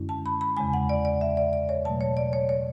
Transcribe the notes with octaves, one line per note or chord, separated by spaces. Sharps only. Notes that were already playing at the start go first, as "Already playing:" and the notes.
Already playing: F#2 D3 G#3 C#4 E4
A5
B5
B5
E2 C#3 G#3 G#5
F#5
D5
D5
E5
D5
D5
C#5
B2 F#3 A3 A5
C#5
D5
C#5
C#5